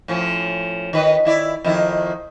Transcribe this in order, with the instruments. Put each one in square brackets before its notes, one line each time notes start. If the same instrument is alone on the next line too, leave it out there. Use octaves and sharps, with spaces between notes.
[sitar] A2 F3 C#4
D#3 B4 D#5
D#3 E4 D5
F2 D#3 E4